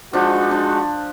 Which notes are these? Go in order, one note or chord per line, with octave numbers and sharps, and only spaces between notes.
F3 G#3 D4 D#4 F#4
D4